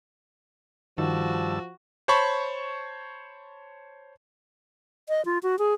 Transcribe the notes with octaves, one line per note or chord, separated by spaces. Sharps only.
G2 D#3 F3 F#4 A5 E6
C5 C#5 A5 B5 C#6
D#5
F4
F#4
G#4